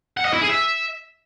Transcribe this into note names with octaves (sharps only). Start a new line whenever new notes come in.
F#5
D#5
E4
G#4
E5